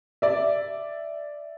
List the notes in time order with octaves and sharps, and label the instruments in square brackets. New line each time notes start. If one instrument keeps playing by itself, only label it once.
[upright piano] D5 E5